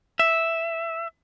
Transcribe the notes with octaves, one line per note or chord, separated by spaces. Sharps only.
E5